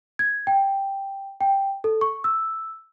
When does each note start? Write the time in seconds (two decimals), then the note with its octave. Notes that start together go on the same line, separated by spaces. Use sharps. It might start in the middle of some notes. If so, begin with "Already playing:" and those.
0.19 G#6
0.47 G5
1.41 G5
1.84 A4
2.01 C#6
2.24 E6